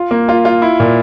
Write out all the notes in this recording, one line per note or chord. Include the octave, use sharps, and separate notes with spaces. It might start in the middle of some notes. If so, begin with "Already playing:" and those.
Already playing: F4
A#3
F4
F4
E4
A#2